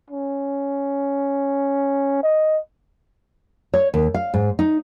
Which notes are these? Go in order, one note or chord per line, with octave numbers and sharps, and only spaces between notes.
C#4
D#5
C#5
D#2
F5
G#2
D#4